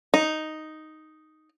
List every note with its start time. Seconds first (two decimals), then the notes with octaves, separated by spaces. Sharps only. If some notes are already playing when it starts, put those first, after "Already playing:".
0.14 D#4